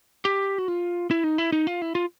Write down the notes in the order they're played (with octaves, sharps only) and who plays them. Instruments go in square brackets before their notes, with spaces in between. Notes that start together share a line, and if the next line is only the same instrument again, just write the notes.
[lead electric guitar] G4
F#4
F4
E4
D#4
E4
D#4
F4
E4
F4